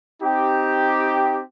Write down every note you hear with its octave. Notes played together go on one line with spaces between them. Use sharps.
C4 D#4 G4